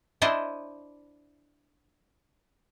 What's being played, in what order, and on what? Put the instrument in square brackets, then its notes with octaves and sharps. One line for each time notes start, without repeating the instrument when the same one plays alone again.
[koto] D4 E4 C5 D#5